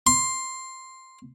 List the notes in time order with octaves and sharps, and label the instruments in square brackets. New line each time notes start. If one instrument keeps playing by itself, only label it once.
[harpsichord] C6